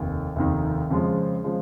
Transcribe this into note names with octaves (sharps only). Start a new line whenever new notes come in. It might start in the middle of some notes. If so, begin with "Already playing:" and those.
Already playing: F1 D#2
F1 D#2 D#3
F2 C#3 F3 G#3 F4
C#3 F3 G#3 F4